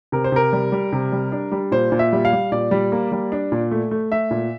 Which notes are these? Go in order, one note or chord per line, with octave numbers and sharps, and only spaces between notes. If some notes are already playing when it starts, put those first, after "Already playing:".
C3 A#4
C5
C3 A#4
G3
G3
C3
G3
D4
G3
A#2 C5
A#2
E5
G3
F5
G3
A#2 D5
G3
A#3
G3
D4
A#2
A3
A3
A3 E5
A#2